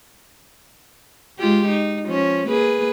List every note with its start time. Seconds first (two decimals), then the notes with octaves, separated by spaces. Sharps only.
1.39 G#3 F4 G4
1.68 D#4
2.05 F3 C#4
2.48 A#3 G#4 B4